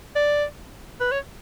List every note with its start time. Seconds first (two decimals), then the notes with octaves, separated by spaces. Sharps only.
0.15 D5
1.00 B4
1.11 C#5